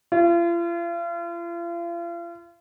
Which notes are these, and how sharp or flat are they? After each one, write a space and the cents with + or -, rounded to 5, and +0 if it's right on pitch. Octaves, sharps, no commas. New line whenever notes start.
F4 -40